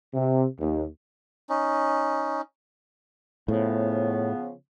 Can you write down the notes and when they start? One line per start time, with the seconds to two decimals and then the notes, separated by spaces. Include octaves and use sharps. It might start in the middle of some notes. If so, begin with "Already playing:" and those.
0.14 C3
0.59 D#2
1.50 C#4 D#4
3.48 A2 C#3 F3 B3